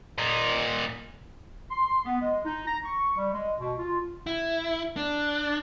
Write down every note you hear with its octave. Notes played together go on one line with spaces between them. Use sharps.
A#2 D#4
C6
B3
G#3
D#4
A#5
C#6
G3
G#3
B2
F4
E4
D4